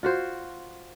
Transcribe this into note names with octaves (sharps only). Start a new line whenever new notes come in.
F4 F#4 C5